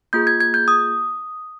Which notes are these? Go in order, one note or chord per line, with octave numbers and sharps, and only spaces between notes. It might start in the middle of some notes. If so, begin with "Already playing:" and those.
A#3 F4 G#4 G6
G#6
G#6
G6
D#6